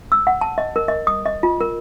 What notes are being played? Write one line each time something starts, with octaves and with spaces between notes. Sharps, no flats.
E6
F#5
A5
D#5
A#4
D#5
D#6
D#5
F4
A#4